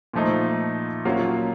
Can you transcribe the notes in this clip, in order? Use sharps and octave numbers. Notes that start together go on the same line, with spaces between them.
A#2 F3 A3 D#4
A#2 F#3 A#3 C#4 F4